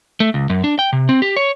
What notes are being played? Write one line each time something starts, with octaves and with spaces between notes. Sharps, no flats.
A3
C#2
F#2
D4
G5
C3
C4
G4
C#5